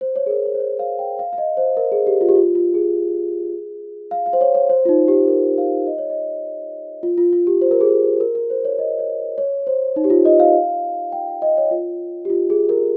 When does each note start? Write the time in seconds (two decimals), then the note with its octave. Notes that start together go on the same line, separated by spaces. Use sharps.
0.01 C5
0.16 C#5
0.26 G#4
0.31 A#4
0.46 C#5
0.54 C5
0.60 C#5
0.79 F5
0.99 G5
1.19 F5
1.33 F5
1.38 D#5
1.57 C5
1.77 A#4
1.92 G#4
2.07 G4
2.21 F4
2.29 G4
2.35 F4
2.55 F4
2.74 G#4
4.11 F5
4.26 F5
4.33 C5
4.41 C#5
4.55 C#5
4.70 C5
4.85 F4
4.89 D#4
5.08 G4
5.28 A#4
5.58 F5
5.87 D#5
5.98 C#5
6.10 D#5
7.03 F4
7.18 F4
7.33 F4
7.47 G4
7.61 C5
7.71 A#4
7.81 G#4
7.89 A#4
8.20 A#4
8.35 A#4
8.50 C5
8.65 C#5
8.79 D#5
8.99 C#5
9.38 C#5
9.67 C5
9.96 D#4
10.04 G4
10.10 F4
10.25 D#5
10.40 F5
11.12 G5
11.28 F5
11.42 D#5
11.57 C#5
11.71 F4
12.25 G4
12.30 F4
12.50 G#4
12.69 A#4